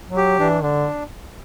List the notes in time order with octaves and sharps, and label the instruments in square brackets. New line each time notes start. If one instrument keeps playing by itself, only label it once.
[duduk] F#3
[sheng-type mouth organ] G4
[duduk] E3 [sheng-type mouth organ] D4
[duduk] D3 [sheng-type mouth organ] D4